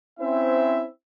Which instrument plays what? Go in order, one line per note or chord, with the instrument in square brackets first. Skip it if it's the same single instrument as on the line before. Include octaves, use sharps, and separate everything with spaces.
[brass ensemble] C4 C#4 E4 C5 E5